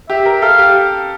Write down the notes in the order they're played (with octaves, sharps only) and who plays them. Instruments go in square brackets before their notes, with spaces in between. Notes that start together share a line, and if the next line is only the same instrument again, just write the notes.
[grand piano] G4 [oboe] E5
[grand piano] A#4
[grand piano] A4 [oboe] F5
[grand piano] G4